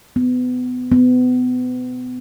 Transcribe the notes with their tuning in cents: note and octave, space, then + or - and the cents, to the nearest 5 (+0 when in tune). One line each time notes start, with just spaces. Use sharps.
B3 +25
B3 +30